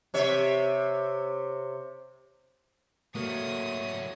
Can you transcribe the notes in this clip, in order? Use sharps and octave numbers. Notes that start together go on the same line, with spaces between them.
C3 C#5 E5
F#3 A3 A#3 F#4 C#5 D#6